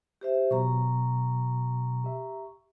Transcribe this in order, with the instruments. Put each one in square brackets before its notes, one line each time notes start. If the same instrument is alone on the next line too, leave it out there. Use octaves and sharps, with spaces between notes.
[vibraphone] G4 C5 E5
[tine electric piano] B2 F#3 [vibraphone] A#5 C#6
[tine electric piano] G4 E5